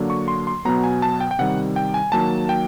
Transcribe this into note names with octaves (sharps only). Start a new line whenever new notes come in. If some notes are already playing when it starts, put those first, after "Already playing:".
Already playing: D3 F#3 A#3 D4
C#6
C6
C6
B2 F#3 B3 A#5
G#5
A5
G5
G5
C3 D#3 G3 F#5
G5
G#5
D#3 F#3 A#3 A5
G5